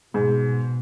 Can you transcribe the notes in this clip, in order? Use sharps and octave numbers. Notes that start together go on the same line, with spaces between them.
G#2 B2